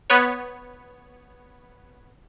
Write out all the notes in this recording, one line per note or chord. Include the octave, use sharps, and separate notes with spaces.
B3 B4 C#5